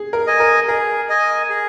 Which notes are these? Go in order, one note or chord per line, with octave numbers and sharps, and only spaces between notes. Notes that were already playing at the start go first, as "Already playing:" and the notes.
Already playing: G#4
A#4
D#5 G#5
A#4
G#4 A#4
D#5 G#5
G#4